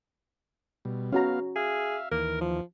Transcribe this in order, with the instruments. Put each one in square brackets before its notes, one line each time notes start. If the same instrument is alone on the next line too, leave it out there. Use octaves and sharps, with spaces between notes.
[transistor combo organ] B2 G3
[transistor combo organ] B3 F5 [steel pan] C#4 F#4 A#5
[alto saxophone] G#4 [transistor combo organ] E5 F5
[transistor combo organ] D#2 E3 [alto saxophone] A#4
[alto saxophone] F3